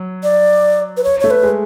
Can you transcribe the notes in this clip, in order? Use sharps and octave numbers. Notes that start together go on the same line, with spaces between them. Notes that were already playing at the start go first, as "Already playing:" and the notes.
Already playing: F#3
D5
B4
C#5
A3 C#5
B4
G#3